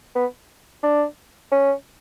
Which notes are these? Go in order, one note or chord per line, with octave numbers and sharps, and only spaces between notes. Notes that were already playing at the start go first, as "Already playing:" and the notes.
B3
D4
C#4